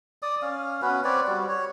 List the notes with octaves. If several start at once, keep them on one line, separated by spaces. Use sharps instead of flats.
D5 D#6
C#4 F5
B3 C#4 F#4 B4
C4 B4 C#5 D5
G3 F#4
C#5